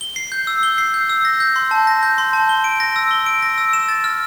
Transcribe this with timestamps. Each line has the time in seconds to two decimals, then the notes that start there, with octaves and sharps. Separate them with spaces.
0.01 G7
0.16 C7
0.32 G6
0.47 E6
0.63 G7
0.78 C7
0.94 G6
1.09 E6
1.25 A#6
1.40 G6
1.56 C6
1.71 A5
1.87 A#6
2.03 G6
2.18 C6
2.33 A5
2.49 G7
2.64 D7
2.80 A#6
2.96 E6
3.11 G7
3.26 D7
3.42 A#6
3.58 E6
3.73 E7
3.88 A6
4.04 F6